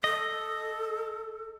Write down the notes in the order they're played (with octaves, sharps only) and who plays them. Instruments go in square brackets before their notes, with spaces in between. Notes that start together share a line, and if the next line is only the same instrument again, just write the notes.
[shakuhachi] A4 [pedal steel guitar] D#5